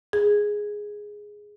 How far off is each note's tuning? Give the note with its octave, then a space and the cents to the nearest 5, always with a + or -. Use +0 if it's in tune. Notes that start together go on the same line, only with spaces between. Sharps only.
G#4 +0